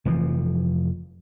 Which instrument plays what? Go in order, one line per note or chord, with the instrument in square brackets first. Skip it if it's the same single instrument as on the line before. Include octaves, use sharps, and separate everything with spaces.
[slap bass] F1 E3 F3